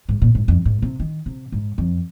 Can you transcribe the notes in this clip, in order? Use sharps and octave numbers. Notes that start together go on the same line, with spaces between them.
G#2
A#2
G#2
F2
G#2
C3
D#3
C3
G#2
F2